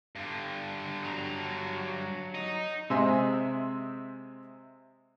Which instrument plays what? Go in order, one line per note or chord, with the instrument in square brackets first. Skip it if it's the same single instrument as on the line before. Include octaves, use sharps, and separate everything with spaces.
[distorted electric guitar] G2 D3
[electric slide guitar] F#3 A#5
[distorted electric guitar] D#4
[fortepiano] C3 G#3 C5 D#5 E5 G#5